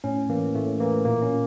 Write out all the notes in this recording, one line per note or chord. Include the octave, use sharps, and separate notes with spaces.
A2 C#4
E3 A#3
A2 A3
E3 A#3
A#2 A#3
C#4